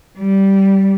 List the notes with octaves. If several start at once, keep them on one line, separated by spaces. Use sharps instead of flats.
G3